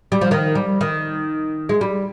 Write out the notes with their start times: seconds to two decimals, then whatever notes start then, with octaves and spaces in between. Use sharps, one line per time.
0.12 G3
0.21 F3
0.31 D#3
0.55 G3
0.81 D#3
1.69 G#3
1.81 G3